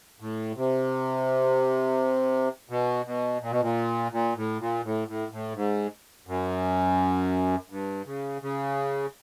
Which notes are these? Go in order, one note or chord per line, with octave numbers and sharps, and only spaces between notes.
A2
C3
B2
B2
A#2
B2
A#2
A#2
A2
A#2
A2
A2
A2
G#2
F#2
G2
C#3
C#3